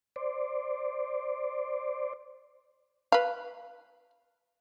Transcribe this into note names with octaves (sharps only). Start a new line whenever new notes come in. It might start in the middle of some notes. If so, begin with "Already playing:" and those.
C5 D5
B4 F5